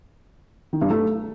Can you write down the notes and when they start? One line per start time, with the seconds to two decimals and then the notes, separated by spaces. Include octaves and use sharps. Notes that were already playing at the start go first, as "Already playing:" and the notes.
0.73 D#3
0.81 G2
0.90 A3